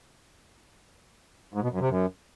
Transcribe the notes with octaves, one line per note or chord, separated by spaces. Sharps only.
G#2
B2
F#2
C3
F#2